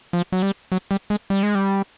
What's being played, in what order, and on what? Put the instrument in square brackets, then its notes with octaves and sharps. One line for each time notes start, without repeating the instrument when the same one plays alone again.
[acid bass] F3
F#3
G3
F#3
G3
G#3
G3
G#3
G3